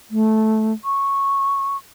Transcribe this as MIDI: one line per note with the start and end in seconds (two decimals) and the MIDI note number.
0.11 0.73 57
0.85 1.77 85